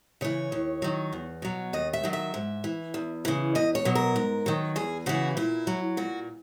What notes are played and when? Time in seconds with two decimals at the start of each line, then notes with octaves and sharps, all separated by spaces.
0.21 C#3 E3 C#5
0.52 D#2
0.82 D#3 F#3
1.13 E2
1.42 B2 F#3
1.73 D#2 D#5
1.93 E5
2.03 D#3 F#3
2.13 E5
2.34 G#2
2.64 E3
2.94 E2
3.25 C#3 E3
3.55 E2 D#5
3.75 C#5
3.85 B2 F#3
3.95 A#4
4.16 G#2
4.46 D#3 F#3
4.76 E2 G#4
5.06 C#3 E3 F#4
5.37 A#2 E4
5.67 F#3
5.97 A#2 F#4